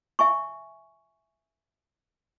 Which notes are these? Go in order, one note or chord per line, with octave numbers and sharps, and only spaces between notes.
E5 G#5 C#6